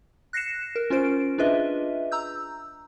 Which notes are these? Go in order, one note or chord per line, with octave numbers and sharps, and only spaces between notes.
F#6 A#6 C7 C#7 E7
A#4
C#4 F4 A#4 C5 D7
D4 F4 G#4 B4 D#5 E5
A#5 E6 G6